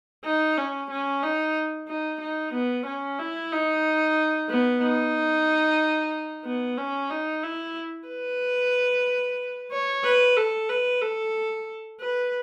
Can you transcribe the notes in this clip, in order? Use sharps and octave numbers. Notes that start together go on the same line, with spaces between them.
D#4
C#4
C#4
D#4
D#4
D#4
B3
C#4
E4
D#4
B3
D#4
B3
C#4
D#4
E4
B4
C#5
B4
A4
B4
A4
B4